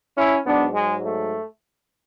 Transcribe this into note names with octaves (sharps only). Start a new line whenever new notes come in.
C#4 E4
G#2 F#3 B3 D4
G#3
A3